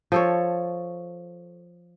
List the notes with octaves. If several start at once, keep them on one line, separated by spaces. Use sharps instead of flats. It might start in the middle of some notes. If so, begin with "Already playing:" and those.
F3 A4 C#5